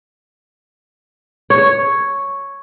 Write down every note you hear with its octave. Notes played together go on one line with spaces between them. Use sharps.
C#5